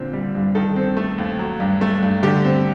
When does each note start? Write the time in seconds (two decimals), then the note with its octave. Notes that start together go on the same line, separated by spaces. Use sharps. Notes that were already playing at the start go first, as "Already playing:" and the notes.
Already playing: A#2 D3 C4
0.13 G3
0.35 G2
0.55 D#3 A4
0.76 C4
0.97 A3
1.18 D#2
1.39 F#3
1.60 G2
1.81 A3
2.03 G2
2.23 D3 G4
2.44 C4